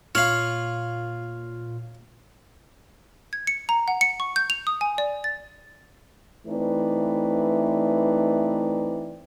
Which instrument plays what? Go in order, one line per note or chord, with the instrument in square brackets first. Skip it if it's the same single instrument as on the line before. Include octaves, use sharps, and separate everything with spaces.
[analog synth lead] A#2 [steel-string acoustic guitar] F4 [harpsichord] C#5 F5 [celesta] F6 F#7
[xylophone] G#6
C#7
A#5
F#5
C#7
C#6
G6
F7
D#6
G#5
D5
A6
[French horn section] E3 A3 C4 D#4 B4 D5